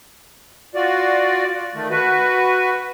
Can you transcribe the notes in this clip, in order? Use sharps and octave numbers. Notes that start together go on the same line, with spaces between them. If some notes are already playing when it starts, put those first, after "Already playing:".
F4 F#4 D5
D#3 A3
F#4 B4